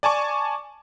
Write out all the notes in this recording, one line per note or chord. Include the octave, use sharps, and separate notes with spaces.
D5 G#5 A5 C#6 D6